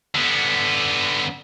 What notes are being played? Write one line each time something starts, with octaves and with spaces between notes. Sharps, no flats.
D3 B3